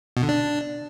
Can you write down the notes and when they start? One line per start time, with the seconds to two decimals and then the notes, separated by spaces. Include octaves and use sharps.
0.17 B2
0.23 D3
0.29 D4